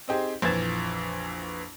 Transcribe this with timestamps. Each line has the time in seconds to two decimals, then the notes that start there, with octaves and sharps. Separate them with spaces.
0.08 C4 D#4 G4 G#4 C5
0.42 A#1 F2 E3 G#6 A6 E7